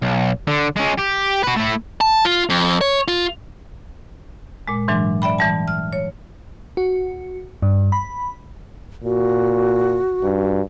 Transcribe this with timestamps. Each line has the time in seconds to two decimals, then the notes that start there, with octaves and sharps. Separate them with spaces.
0.02 B1
0.47 D3
0.76 G#3 C#4
0.98 G4
1.43 F#4 B4
1.56 A3 E4
2.01 A5
2.25 F4
2.49 F2
2.81 C#5
3.08 F4
4.68 A#2 G#3
4.88 G#2 E3 F#3 G#3 D4
5.22 D5 E5 G5 B5
5.38 E3 G3 A5
5.68 F6
5.93 C#5
6.77 F#4
7.62 G2
7.92 B5
9.04 A#2 F#4
10.23 G2